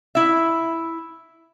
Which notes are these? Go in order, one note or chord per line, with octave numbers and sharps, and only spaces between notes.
E4 E5